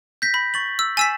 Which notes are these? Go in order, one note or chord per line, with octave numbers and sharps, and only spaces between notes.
G6 A#6 B6
B5
C#6 A6 F#7
E6
G#5 E6 A6 B6 C7 E7